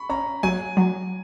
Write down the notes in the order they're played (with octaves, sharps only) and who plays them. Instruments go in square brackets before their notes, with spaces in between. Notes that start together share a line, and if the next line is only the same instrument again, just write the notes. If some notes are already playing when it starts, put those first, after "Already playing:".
Already playing: [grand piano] B5 C#6
[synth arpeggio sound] C#4 [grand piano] A#5
[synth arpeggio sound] F#3 [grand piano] G#5
[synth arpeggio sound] F#3